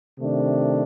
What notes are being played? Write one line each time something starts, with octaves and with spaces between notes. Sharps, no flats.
C3 D#3 A3 D4